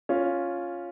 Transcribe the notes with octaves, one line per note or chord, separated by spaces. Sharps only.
C#4 F4